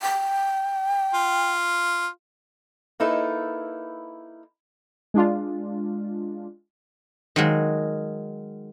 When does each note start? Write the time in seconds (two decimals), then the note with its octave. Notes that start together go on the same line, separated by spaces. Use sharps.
0.01 G5
1.14 F4
3.00 A#3 D#4 E4 A4 B4
5.14 G#3 D4 F4
7.36 D#3 F#3 G#3